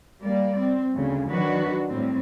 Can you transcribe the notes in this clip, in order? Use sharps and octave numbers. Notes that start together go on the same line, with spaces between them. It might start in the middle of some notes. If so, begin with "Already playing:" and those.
G3 A#3 D5
C4
D2 C#3
D#3 F#3 D4 F#4 B4
A2 G3 C4